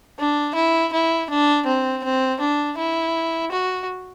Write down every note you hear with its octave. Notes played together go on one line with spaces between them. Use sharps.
D4
E4
E4
D4
C4
C4
D4
E4
F#4